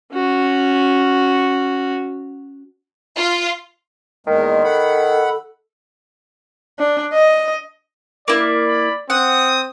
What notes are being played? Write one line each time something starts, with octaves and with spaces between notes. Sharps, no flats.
C#4 F#4
F4
E2 D#3 G#3 A#3
A4 F#5 B5
D4
D#5
A#3 E4 D5
B5
C4 F#5 D#6